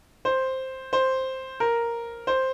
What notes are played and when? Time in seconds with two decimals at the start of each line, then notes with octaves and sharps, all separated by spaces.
0.25 C5
0.93 C5
1.60 A#4
2.27 C5